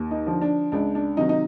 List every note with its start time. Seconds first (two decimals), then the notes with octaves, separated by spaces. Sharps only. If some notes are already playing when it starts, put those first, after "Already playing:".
Already playing: D#2
0.11 D#4
0.27 D3 F3
0.41 D4
0.72 C#2 D4
0.95 D4
1.17 C3 D#3 F#3 D#4
1.29 D#4